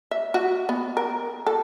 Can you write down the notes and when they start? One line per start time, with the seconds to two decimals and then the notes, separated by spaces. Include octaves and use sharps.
0.11 E5
0.34 F#4
0.69 B3
0.97 A#4
1.47 A4